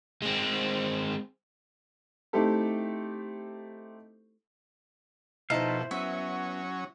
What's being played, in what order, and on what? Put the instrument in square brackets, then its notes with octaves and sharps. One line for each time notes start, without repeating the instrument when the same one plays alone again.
[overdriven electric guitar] G#3 C4
[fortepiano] A3 C4 D#4 E4 G4 A4
[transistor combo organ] B2 [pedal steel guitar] F3 A4 F5 [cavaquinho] D#4 [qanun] E4 C5
[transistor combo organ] F#3 C#4 [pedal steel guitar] B3 [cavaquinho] E5